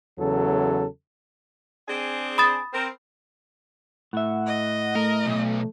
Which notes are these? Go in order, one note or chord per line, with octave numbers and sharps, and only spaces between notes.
E2 C#3 F#3 A4
C4 D4 G#4
B5 D#6 A6
C4 A#4
A2 E5 F#5
D#5
A3 A#4
B1